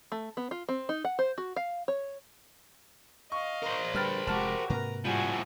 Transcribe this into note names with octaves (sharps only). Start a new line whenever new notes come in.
A3
B3
F4
C4
D#4
F#5
C5
F#4
F5
C#5
D#5 F5 C#6
A#4 C5
D3 G3 B4 G5 F6 A6
F1 C3 G#3 F#4 G4 A5 F6
G#2 C3 A#3 A#4 B4 A#5
A2 F3 G3 F#4 G#5